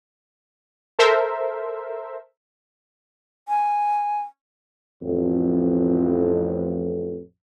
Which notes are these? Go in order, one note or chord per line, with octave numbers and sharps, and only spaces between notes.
A4 A#4 C5 E5
G#5
A1 F2